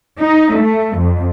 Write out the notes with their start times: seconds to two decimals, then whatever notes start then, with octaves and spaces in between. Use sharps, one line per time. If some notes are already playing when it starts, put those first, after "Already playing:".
0.18 D#4
0.53 A3
0.96 F2